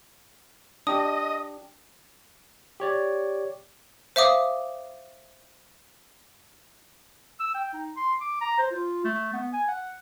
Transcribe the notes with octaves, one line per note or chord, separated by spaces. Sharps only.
D4 G4 D#5 D#6
G4 C#5 D5
C5 E5 F5 D6 D#6
E6
G5
D#4
C6
D6
A#5
C5
F4
A3
B3
G#5
F#5